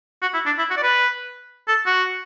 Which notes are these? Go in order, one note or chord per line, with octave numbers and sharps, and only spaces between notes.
F#4
E4
D4
E4
F#4
D5
B4
A4
F#4